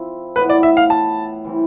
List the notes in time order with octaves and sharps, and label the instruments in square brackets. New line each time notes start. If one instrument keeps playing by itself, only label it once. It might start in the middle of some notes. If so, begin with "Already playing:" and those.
Already playing: [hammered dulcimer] F3 C4 E4
[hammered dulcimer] A2 E3 B3 [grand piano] B4
[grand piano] D5
E5
F5
A5
[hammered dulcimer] E3 G3 C4